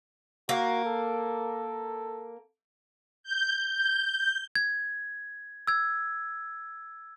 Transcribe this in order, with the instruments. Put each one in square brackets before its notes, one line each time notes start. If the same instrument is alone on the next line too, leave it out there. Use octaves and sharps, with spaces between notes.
[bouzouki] A#3 [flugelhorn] F#4
[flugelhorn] A4
[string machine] G6
G6
[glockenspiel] G#6
E6 G#6